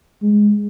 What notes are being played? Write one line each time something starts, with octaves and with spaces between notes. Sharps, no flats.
G#3